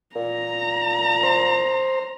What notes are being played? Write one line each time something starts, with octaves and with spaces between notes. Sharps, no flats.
A#2 A#5
C5